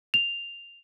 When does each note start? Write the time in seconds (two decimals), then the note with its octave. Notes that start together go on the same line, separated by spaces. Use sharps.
0.14 F7